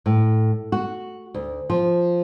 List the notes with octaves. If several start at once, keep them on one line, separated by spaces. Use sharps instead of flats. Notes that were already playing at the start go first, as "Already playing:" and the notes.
A2
F#4
D2
F3